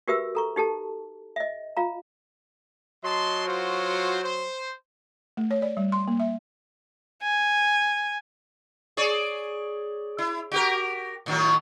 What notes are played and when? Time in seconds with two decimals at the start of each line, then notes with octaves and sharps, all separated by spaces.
0.08 F#4 G4 A#4 B4 E5 E6
0.35 A4 A#5 C#6
0.56 D#4 G4 A4 A5
1.36 D#5 E5
1.77 F4 F5 A#5
3.04 F#3 D#5 A5 C6
3.47 F4 F#4 C5
4.22 C5
5.37 A3
5.51 C#5
5.62 D5
5.77 G3
5.92 C6
6.08 A#3
6.20 E5
7.22 G#5
8.97 G#4 C#5 D5
10.18 E4
10.52 F#4 G4 A#4
11.26 A2 D#3 F#3